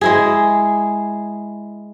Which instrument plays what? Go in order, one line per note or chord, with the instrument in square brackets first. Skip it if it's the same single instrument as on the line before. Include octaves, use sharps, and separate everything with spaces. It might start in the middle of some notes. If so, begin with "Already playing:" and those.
[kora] G#3 E4 G#4